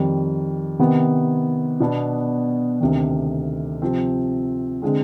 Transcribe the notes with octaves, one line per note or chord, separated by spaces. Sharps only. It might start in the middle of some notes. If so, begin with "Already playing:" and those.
Already playing: F2 D#3 G3
C3 D#3 B3
B2 B3 D4
D2 C3 D#3
C3 F3 C4
D3 G#3 C4